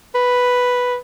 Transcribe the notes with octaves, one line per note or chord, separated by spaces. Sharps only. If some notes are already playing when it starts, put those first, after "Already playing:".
B4